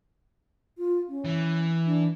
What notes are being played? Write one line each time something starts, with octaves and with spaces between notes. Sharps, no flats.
F4
C#4
E3
D4